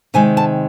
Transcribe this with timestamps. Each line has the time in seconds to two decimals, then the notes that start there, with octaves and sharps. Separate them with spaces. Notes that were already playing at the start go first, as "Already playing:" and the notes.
0.14 C3 D#3 G#3 G#5
0.37 A5